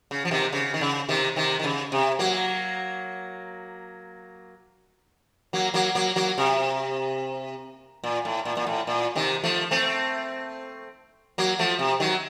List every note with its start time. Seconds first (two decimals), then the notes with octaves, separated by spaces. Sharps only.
0.11 C#3
0.25 F3
0.31 C3 D#3
0.53 C#3
0.74 D#3
0.81 C#3
1.09 C3 D#3
1.36 C3 D#3
1.60 D#3
1.64 C#3
1.92 C3
2.19 F#3 A#3
5.53 F#3 A#3
5.74 F#3 A#3
5.95 F#3 A#3
6.16 F#3 A#3
6.38 C3
8.04 A#2
8.25 A2
8.45 A#2
8.57 A#2
8.67 A2
8.87 A#2
9.15 C3 D#3
9.44 F3 A3
9.71 A3 C4
11.38 F#3 A#3
11.59 F3 A3
11.79 C3
12.00 D#3 F#3